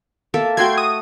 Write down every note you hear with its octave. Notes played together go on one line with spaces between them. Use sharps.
A#3 A4 E5
A3 F#4 G5 C6 G#6
D#6